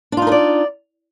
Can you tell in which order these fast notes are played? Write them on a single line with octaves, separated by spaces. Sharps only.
D4 F4 D#4 A#4 D5